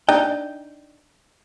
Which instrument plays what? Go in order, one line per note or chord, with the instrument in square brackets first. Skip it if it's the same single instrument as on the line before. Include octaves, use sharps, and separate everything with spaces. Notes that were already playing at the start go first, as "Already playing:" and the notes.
[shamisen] D4 D#4 [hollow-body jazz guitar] G5